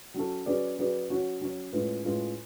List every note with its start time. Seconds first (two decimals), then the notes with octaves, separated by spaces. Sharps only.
0.14 F#3 C#4 F#4 A4
0.46 F#3 C#4 G#4 B4 D5
0.78 F#3 C#4 G#4 B4 D5
1.10 F#3 C#4 F#4 C#5
1.41 F#3 C#4 F#4 C#5
1.73 A2 G#3 C#4 F4 B4
2.04 A2 G#3 C#4 F4 B4